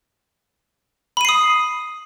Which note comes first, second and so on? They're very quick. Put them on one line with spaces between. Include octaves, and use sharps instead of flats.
B5 D#7 C7 D#6